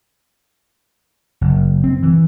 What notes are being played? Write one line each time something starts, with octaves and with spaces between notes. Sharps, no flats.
F#1
C4
E3